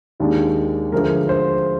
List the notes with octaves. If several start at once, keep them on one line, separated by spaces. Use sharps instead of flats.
D#2 D#3 G#3 D4
D2 D3 F3 G#3 A#4
C5